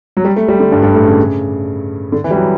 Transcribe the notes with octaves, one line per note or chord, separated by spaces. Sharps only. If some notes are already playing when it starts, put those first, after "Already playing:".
F#3
G3
A3
G3
D3
G2
G2
A2
C#3
D3
E3
G3
F#3